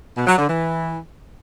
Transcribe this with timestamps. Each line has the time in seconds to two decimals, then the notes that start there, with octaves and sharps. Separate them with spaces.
0.16 B2
0.27 F#3
0.38 D3
0.48 E3